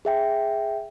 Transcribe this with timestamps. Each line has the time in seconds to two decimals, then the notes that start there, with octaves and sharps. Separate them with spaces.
0.05 G#4 E5 G5